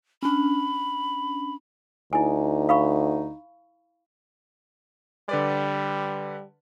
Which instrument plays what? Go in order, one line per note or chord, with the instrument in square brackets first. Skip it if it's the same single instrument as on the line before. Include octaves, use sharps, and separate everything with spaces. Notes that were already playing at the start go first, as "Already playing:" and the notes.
[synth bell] C#4 D4 [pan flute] B5
[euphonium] D2 [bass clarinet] D#4 [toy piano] E4 G#5
[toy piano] F5 B5 C#6
[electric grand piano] D3 B4 D5 [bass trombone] G3